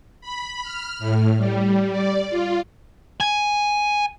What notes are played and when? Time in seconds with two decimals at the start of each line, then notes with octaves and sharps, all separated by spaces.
0.21 B5
0.63 F6
0.99 A2
1.38 G3
1.92 D5
2.29 F4
3.20 G#5